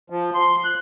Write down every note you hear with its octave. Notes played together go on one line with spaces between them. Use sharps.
F3
C6
F#6